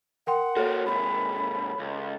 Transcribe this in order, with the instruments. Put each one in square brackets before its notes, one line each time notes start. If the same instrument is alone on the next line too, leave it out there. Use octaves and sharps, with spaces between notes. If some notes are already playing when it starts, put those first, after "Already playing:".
[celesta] A#4 G5 C6 [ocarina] F#5
[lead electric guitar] A#3 F#4 [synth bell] A4 C#5
[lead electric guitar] G#2 C3 [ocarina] B5
[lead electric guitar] C#2